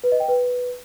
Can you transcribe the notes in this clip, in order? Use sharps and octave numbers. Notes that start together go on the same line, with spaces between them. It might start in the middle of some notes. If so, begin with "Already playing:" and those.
B4
D#5
G5
B4